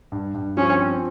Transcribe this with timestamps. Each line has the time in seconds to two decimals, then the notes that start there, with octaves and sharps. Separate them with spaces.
0.12 G2
0.34 G2
0.57 F3 C#4
0.79 C4